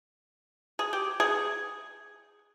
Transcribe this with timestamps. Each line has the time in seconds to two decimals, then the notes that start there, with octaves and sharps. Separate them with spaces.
0.79 G#4
0.93 G4
1.20 G#4